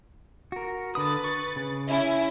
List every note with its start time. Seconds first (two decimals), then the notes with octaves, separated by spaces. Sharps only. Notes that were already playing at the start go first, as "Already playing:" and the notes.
0.52 F#4 A#4
0.95 D3 B4 B5 D#6 A6
1.24 C#6
1.56 C#3
1.87 C#4 E4